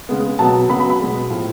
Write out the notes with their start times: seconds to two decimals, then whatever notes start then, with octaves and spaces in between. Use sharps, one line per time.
0.09 C#3 G#3 B3
0.39 B2 F#3 B3 A5
0.69 C#3 F#3 B3 B5
0.80 B5
0.90 B5
0.99 B2 G#3 B3
1.30 A2 F3 A3